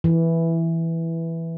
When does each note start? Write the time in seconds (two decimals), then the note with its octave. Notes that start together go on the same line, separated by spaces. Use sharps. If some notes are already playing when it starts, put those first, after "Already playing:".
0.04 E3